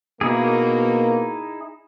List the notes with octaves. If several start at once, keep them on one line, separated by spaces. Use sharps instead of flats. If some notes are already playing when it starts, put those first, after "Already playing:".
B2 A#3 D#4 E4 G#4